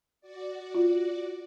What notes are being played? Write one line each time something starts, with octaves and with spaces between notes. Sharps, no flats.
F#4 D5
F4